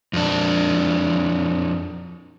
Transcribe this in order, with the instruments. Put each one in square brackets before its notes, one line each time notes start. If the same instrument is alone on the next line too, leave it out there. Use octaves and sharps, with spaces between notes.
[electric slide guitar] F2 D4